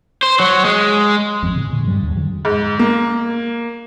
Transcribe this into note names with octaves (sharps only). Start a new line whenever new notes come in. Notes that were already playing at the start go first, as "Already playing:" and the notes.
C5
F#3
G#3
G#1 F2 C4
A2 C#3
A#2 D3
G2 F#3 G3
D#2
F2 D3 F#3
G#2
A#3